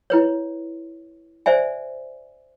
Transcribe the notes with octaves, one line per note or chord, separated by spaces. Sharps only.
E4 B4 C#5
C5 D5 E5 G#5